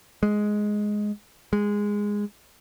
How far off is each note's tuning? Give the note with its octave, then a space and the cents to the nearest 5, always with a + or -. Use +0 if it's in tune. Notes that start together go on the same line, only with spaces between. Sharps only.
G#3 +5
G#3 -10